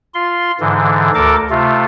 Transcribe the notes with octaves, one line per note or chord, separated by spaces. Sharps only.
F4 C6
G#2 D3 E3
D2 A4 A#4 D6
C3 A3 F4